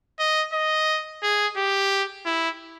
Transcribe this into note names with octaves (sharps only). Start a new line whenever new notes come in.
D#5
D#5
G#4
G4
E4